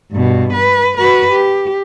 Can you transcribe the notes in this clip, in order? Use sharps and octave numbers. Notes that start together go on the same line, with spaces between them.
G2 B2
B4
F#4 B4
G4